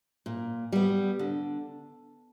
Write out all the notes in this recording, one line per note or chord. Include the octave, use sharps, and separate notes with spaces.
A#2
G3 B3
D3